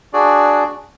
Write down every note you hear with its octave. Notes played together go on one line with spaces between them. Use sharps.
D4 F#4 G#4 D5